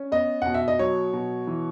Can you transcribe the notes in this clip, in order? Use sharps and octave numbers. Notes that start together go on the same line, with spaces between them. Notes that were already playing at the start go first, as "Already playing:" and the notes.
Already playing: C#4
B3 D#5
B2 F#5
E5
D#5
F#3 C#5
B2
E3